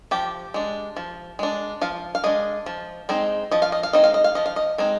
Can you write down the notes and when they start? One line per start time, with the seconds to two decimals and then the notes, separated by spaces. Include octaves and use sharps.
0.11 F3 G4
0.54 G#3 D4
0.96 F3
1.39 G#3 D4
1.81 F3 F5
2.15 F5
2.24 G#3 D4 D#5
2.66 F3
3.09 G#3 C4 D#4
3.51 F3 D#5
3.62 F5
3.72 D#5
3.83 F5
3.93 G#3 C4 D#4 D#5
4.04 F5
4.14 D#5
4.24 F5
4.35 F3 D#5
4.46 F5
4.56 D#5
4.78 G#3 C4 D#4